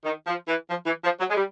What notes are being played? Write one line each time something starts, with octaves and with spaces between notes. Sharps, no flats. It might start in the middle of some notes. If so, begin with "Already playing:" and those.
D#3
F3
E3
F3
E3
F3
F#3
G#3
G3